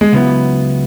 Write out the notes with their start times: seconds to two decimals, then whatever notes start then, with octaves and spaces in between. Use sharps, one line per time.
0.01 G#3
0.12 C#2 C#3 F#3 B3 E4